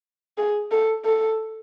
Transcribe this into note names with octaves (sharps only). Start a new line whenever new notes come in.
G#4
A4
A4